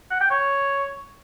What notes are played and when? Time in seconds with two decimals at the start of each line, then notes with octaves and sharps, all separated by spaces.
0.11 F#5
0.21 G5
0.30 C#5